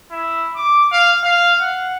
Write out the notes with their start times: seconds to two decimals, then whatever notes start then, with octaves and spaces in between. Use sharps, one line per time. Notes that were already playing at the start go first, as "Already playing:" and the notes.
0.12 E4
0.56 D6
0.92 F5
1.23 F5
1.60 F#5